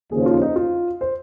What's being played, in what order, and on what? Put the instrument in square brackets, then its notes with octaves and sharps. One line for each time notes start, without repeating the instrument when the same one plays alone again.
[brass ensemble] D#2 C#3 F3 [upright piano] G#4
[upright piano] F4
D#4
F4
C5